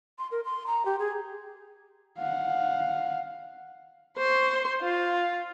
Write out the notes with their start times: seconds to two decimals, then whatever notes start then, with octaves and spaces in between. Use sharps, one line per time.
0.19 C6
0.31 A#4
0.45 C6
0.67 A#5
0.86 G4
0.99 G#4
2.19 F5 F#5
4.18 C5 C6 C#6
4.82 F4